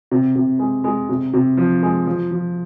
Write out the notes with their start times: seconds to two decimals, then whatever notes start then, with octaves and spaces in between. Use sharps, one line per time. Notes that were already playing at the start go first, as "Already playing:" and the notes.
0.11 C3
0.35 C3
0.59 G#3
0.84 G#3
1.09 C3
1.34 C3
1.57 F3
1.82 G#3
2.06 F3
2.31 F3